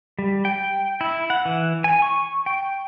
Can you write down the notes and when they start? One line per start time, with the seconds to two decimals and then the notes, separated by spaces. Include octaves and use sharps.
0.19 G3
0.45 G5
1.01 E4
1.30 F#5
1.45 E3
1.84 G#5
2.02 C#6
2.46 G5